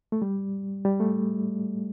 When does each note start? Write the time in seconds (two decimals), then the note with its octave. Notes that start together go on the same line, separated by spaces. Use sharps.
0.12 A3
0.22 G3
0.85 G3
1.00 A3